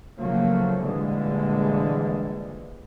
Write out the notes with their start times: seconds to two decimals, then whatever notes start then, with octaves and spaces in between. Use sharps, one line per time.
0.19 C#3 F3 F#3 A3 A#3
0.82 A#1 A#2 D3 E3 G3 G#3